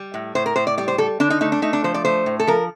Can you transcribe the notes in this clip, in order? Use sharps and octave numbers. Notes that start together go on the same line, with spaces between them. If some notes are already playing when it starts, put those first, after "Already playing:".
Already playing: G3
A2
A2 C5
A#4
A2 C5
D5
G3 D5
C5
G3 A4
D3 D4
D#4
A3 D#4
D4
A3 D#4
D4
F3 C5
D5
A3 C5
A2
A4
F3 A#4